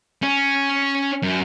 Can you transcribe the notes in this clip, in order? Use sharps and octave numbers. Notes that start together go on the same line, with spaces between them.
C#4
F#2